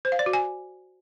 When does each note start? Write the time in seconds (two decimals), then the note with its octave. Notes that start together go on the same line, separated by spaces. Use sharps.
0.05 C5
0.12 F5
0.19 D5
0.26 F#4
0.33 G#5